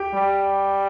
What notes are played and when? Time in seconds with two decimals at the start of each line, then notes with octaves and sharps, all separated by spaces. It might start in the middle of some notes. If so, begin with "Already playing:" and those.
Already playing: G4 G5
0.14 G3